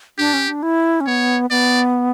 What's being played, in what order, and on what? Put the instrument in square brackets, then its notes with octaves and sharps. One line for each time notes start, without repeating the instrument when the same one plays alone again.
[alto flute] D4 [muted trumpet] G4
[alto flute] C#4
D4
E4
C#4
[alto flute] B3 [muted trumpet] C#5
[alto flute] B3 [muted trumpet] D5